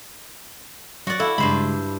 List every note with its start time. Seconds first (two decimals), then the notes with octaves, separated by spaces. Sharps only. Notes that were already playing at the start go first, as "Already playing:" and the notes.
1.07 F#3 F#4 D5
1.20 E4 A4 F5
1.38 G2 C#3 G#3 C5 B5